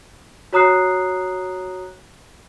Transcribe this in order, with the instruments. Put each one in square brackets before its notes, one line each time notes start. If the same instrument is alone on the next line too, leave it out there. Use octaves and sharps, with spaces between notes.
[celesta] F#4 C#5 A#5 D#6 F#6 C7